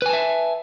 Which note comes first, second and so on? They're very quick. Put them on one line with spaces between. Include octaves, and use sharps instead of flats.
B4 G#5 A5 E5